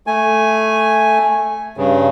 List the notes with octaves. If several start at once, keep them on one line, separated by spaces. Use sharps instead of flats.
A3 G#5
G2 C#3